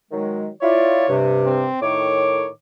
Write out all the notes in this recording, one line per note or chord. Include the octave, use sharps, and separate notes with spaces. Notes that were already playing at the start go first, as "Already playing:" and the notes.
D#3 F#3 G#3
E4 F4 C#5 D5
G2 C3
C4
A2 D#3 C#5 D6